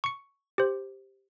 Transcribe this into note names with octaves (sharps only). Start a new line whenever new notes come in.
C#6 C#7
G4 C5